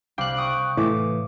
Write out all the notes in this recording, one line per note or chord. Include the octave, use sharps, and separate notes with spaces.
C2 F5 G5 D6 F#6
C#6 D#6 D7
A2 E3 D6